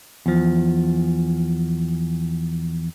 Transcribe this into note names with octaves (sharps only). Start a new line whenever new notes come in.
E2 F3